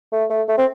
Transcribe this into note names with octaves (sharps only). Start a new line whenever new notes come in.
A3
A3
A3
C4